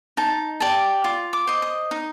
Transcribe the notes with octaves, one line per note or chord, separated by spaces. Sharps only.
D#4 A5
G4 D5 A5
F4
D6
C5 D#5
D#6
D#4